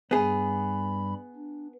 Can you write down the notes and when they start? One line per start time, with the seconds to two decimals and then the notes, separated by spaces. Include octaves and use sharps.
0.11 G2 G3 B3 G#4 B5
1.35 D4